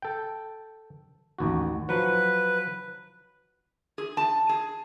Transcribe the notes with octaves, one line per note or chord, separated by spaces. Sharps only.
A4 G5
A1 D#2 F#4
F3 F#3 B4
G#4
A5
G#4